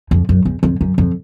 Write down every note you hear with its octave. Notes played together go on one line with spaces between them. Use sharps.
F2
F#2
E2
F2
F#2
F2